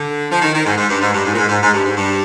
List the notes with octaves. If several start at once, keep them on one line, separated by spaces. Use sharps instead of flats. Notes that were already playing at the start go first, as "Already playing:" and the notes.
Already playing: D3
F3
D#3
D#3
G#2
G#2
G2
G#2
G2
G#2
A#2
G#2
G#2
G#2
G2
G#2
G2